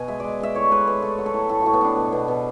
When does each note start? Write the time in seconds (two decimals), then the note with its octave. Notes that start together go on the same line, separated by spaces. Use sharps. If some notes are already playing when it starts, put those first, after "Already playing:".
Already playing: B2 G#5
0.08 G#3 E5
0.20 G#3 D5
0.40 G#3 E5
0.55 A2 C#5
0.71 G#3 B4
0.87 G#3 B4
1.02 A3 A4
1.18 F#3
1.26 A4
1.34 A2
1.49 A2 A4
1.62 A2 F#4
1.73 B3
1.81 A2 D4
1.96 B2
2.12 B2
2.28 B2